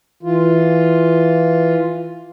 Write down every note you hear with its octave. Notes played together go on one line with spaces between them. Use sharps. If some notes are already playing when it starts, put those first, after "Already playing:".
E3 F4